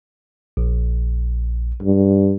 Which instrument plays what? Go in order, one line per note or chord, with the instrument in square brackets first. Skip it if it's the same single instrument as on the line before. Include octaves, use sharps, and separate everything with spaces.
[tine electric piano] A#1
[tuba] G2